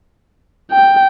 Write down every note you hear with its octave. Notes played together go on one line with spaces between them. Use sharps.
G5